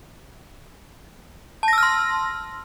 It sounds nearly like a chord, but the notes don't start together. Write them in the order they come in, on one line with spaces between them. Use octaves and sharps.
A5 A#6 E6 F6 C6